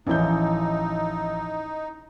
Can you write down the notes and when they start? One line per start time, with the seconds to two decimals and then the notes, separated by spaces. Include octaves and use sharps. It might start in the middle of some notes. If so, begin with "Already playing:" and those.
0.07 A1 F3 C#4 D#4 E4 G6